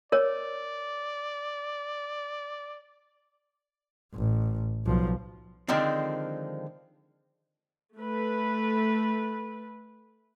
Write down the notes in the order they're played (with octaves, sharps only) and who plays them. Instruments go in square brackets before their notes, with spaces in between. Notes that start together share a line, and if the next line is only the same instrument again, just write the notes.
[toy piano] A#4 C#5 [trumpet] D5
[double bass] A1
B1 F3
[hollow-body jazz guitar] D3 D#3 F3 G#3 C4 D4
[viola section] A3 B4